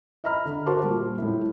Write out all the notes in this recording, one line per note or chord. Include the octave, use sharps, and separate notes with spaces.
D#5 E5 A#5 B5 F6
D3
F#4 A#4 C5 A5 C6 D6
A#2 G3
A2 E4